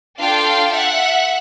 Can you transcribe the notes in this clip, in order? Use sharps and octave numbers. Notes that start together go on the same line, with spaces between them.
D4 F4 A4 F5 G5
E5 F#5